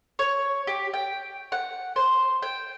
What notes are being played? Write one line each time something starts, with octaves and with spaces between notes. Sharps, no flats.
C#5
G4
G5
F#5
C5
G5